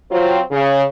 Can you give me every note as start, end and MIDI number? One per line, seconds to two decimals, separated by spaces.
0.11 0.40 54
0.11 0.40 60
0.11 0.40 65
0.51 0.83 49